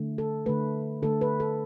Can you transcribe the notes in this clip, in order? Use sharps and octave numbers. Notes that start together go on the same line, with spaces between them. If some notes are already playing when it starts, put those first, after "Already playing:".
Already playing: D3 A3
A4
D3 A3 B4
D3 A3 A4
B4
A4